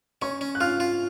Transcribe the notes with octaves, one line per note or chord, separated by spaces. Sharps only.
C#4 C#5 C#6
C#4
F#6
F4 F5 F6
F4